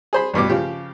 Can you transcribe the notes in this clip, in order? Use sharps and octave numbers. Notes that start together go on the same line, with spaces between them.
G#4 C5 B5
A1 G2 B2 D6
C#3 F3 G4